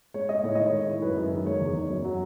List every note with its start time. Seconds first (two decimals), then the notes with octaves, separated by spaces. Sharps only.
0.14 G#3 C#5
0.29 G#3 D#5
0.43 A2 C#5
0.55 D#3 D#5
0.66 C#5
0.73 G#3
0.88 E4
1.02 F#2 B4
1.17 F#2
1.32 D#3
1.46 G#3 C#5
1.61 E2
1.75 D#4
1.90 F#2
2.04 F#3